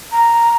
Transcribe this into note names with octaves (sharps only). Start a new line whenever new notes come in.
A#5